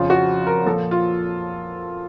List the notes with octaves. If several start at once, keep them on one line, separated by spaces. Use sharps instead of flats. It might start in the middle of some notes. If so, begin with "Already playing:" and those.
Already playing: F2 C#3 F3 F4
F#4
A#4
A#2 F3 A4
F4